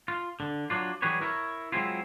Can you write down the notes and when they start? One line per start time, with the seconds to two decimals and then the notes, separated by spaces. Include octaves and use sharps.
0.08 F4
0.40 D3
0.70 F#3 D4 F4
1.02 E3 F#3 G3 G#4 B4 C#5
1.21 E4 A#4 C#5
1.72 F#3 G#3 C4 E4 F4